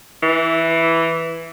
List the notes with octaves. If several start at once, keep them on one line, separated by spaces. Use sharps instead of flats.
E3